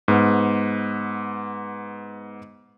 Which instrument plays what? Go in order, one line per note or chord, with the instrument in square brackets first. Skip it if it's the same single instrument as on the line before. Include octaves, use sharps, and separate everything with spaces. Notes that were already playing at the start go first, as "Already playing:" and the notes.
[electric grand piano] G#2 B3